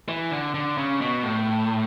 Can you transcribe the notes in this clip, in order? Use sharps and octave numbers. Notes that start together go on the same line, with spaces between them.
E3
D3
D3
C#3
B2
A2